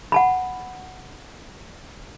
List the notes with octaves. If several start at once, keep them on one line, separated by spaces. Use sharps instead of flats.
F#5 A5 B5